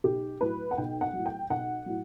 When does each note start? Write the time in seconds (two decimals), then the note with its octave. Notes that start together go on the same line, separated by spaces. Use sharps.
0.04 B1 G4
0.41 A2 F#3 B4
0.71 F#5
0.77 B1 G5
1.01 F#5
1.13 A2 F#3
1.26 G5
1.50 B1 F#5
1.86 A2 F#3